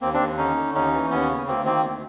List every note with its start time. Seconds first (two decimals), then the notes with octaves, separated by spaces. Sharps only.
0.01 D#2 A#3 C4
0.14 C4 D4
0.20 D#2
0.38 D3 C#4 D#4
0.56 D3
0.74 D#2 C#4 D#4
0.93 E3
1.10 D#2 B3 C#4
1.29 C#3
1.46 D2 A#3 C4
1.65 D#3 A#3 C4
1.83 D2